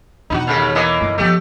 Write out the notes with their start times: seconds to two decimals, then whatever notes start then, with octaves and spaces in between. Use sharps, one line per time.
0.30 E2 B2 D#4 E4 F#4
0.47 D#2 C#3 A3
0.75 E3 A#3 D#5
1.01 G1 E4
1.18 F3 A3 B3 G4